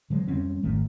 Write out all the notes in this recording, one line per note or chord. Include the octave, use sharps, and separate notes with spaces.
D3 F#3 G#3
F2 G3 C4 C#4
G#1 D#3 A3